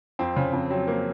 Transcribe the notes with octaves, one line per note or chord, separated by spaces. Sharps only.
F2 C4
C#3
F2
F#3 C4
A#3